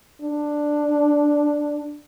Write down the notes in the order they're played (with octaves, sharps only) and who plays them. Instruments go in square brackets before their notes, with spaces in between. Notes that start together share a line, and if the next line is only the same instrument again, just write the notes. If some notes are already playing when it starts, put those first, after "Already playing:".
[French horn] D4